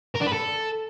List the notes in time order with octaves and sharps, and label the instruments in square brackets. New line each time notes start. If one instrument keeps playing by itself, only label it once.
[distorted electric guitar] A#4
D4
B4
A4